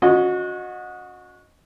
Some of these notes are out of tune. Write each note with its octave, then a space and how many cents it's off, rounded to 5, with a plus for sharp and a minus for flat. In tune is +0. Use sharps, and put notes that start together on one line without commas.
C#4 +15 F#4 -25 D#5 -5